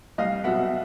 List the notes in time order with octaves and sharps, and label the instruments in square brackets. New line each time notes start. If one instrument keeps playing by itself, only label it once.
[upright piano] C2 D#5 F5
B2 F#3 B3 E5 F#5